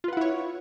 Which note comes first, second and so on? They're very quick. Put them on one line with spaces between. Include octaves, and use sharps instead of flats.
F4 B4 F#5 E4 C#5